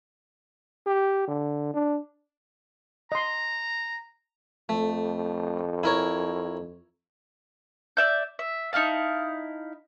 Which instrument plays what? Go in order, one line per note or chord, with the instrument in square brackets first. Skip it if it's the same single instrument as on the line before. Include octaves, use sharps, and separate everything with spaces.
[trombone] G4
D3
D4
[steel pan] D#5 C6 [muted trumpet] A#5
[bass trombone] F2 [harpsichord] A3
[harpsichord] E4 A#4 C#5
[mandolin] D5 E5 G6
E5
D#4 E4 F5 A5